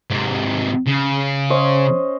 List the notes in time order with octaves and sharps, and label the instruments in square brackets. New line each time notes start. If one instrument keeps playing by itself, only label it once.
[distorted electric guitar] G#2 C3
C#3
[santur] C#4 C5 D#5